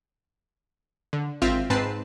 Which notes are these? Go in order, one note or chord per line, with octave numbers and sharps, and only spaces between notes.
D3
G#1 C4 F4 E5 F6
G#2 C4 B4 A5 C7